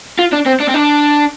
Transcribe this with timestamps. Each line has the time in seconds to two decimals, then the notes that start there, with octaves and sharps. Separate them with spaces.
0.19 F4
0.32 D4
0.46 C4
0.60 D4
0.69 C4
0.74 D4